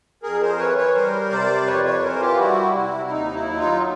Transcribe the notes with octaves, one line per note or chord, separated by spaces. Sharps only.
F2 G#4 A#4
A#4 C5
E3 B4 C#5
B4 C#5
G3 A#4 C5
C3 C5 D5
F2 B4 C#5
B4 C#5
E3 A#4 C5
F4 G4
G3 E4 F#4
C3 E4
D#2 D#4
E4
F#3
D#4 F4